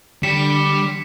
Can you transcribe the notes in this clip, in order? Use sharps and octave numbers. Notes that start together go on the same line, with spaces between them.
D3 G3 D6 B6 C#7 E7